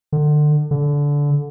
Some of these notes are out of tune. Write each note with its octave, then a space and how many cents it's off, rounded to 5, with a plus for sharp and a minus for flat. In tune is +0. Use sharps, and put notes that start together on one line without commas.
D3 +30
D3 -20